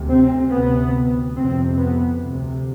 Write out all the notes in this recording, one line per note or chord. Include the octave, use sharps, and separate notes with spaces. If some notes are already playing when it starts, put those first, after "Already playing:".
Already playing: D2 C3
C4
D2 C3 B3
F2 C3 C4
B3
D2 C3